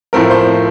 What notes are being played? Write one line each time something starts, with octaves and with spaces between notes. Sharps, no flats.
A2 F3 A3 C4 A#4
C4 C5